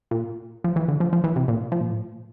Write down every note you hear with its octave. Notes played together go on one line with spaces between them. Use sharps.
A#2
F3
E3
D3
F3
F3
E3
C3
A#2
F3
A#2
A2